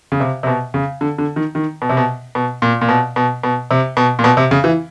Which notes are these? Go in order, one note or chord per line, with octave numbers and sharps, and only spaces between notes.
C#3
C3
C3
B2
C#3
D3
D3
D#3
D#3
B2
C3
B2
B2
A#2
A#2
B2
B2
B2
C3
B2
A#2
B2
C3
C#3
E3